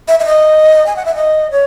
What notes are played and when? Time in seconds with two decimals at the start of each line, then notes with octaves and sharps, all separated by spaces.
0.08 E5
0.20 E5
0.26 D#5
0.86 G#5
0.96 F#5
1.05 E5
1.15 D#5
1.51 C#5